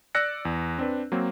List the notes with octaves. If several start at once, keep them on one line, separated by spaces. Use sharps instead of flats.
D5 E6 F#6 A#6 C#7
E2
C4 D4 B4
F#3 A#3 C4